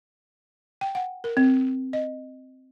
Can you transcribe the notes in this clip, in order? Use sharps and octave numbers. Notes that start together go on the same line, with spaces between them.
G5
F#5
A#4
C4
D#5